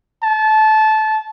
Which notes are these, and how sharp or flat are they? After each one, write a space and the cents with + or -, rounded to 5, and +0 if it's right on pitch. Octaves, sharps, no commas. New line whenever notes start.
A5 -20